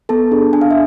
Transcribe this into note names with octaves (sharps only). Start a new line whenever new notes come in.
B3 A4 A5
D4 G#4
D4 G#5
F5
E5